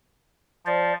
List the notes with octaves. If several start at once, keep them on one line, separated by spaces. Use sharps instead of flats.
F3 C5 D5